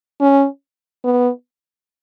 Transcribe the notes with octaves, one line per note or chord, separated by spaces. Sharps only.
C#4
B3